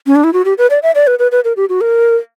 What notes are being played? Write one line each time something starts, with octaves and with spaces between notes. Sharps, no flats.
C#4
D4
E4
F#4
G4
B4
D5
E5
D5
B4
B4
B4
A#4
G4
F#4
A#4